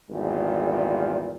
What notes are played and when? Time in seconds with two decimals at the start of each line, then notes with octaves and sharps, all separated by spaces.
0.11 G#1 E2 A#2 G3